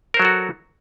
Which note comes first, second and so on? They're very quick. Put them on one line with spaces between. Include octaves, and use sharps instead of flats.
A#4 C5 F#3 A4 F#4